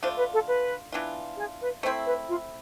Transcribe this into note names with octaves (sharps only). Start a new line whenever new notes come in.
D3 A3 D4 F4 C5
B4
A4
B4
E3 B3 D4 F4
G#4
B4
A3 C4 E4 C5
B4
F4